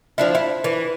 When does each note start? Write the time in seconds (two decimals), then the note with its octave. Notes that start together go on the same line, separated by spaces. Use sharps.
0.18 F3 D4 E4
0.35 E4
0.64 E3